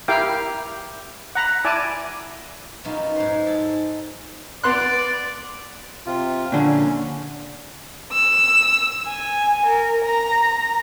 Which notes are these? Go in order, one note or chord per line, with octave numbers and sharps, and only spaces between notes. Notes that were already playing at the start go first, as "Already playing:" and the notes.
E4 G4 A#4 F5 G5 D6
F#5 A#5 B5
E4 D5 G#5 A5 D6
F#2 B2 D#4 F4
G#2 C5
G#4 A4
B3 D5 C6 F#6
C3 F4
A#2 D3 C#4
E6
G#5
A#4
A#5